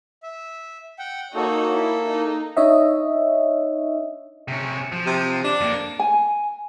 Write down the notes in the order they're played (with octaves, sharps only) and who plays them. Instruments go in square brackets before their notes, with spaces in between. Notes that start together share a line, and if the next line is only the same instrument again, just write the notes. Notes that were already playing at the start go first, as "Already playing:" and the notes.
[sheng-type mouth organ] E5
F#5 G5
[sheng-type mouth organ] A#3 A4 [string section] D#4 F#4 C#5
[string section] E4
D#4
[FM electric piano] D4 D#4 C#5 D#5 E5
[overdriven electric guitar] C3 C#4
F3
[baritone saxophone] C3
D4
[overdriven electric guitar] F2 A#3
[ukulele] G#5